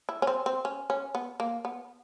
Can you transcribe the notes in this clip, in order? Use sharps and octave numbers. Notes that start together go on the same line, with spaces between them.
E4
C#4
C4
C4
C#4
C#4
B3
A#3
B3